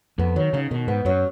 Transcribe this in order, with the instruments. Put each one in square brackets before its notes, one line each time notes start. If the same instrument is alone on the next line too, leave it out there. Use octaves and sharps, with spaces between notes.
[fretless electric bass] F2 [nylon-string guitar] B3
[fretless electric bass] D#3 [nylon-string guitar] F#3
[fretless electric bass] C#3 [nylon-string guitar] D#4
[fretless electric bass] B2 [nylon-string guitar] D#3
[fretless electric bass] G#2 [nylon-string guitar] B3
[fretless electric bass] F#2 [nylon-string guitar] F#3